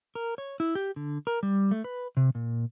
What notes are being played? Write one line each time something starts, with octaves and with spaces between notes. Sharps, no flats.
A#4
C#5
E4
G4
D3
A#4
G3
A3
B4
C3
A#2